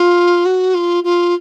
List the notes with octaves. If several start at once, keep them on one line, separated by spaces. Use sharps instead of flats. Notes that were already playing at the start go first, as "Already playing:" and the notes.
Already playing: F4
F#4
F4
F4